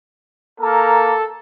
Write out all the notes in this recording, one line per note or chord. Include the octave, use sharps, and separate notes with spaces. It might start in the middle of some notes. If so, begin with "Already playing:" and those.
A#3 A4 A#4 A#5